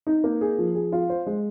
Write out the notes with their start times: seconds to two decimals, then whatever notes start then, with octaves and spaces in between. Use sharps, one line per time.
0.07 D#4
0.24 A#3
0.41 G#4
0.58 F3
0.75 G#4
0.92 F4
1.10 C5
1.26 G#3